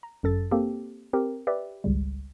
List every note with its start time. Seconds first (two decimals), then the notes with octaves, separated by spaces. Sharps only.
0.03 A#5
0.23 G1 F#2 A4 A6
0.51 A#3 C4 G4 A4
1.13 C4 G4 A#4
1.47 G4 B4 D5 E5
1.84 G#1 C#2 C#3 G3